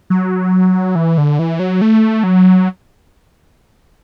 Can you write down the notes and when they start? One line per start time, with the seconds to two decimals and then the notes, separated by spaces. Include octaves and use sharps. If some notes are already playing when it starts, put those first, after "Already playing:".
0.10 F#3
0.95 E3
1.18 D3
1.39 E3
1.59 F#3
1.81 A3
2.23 F#3